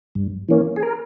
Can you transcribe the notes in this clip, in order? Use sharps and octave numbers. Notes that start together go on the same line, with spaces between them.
G2
E3 A#3 C#4
G#4
A#4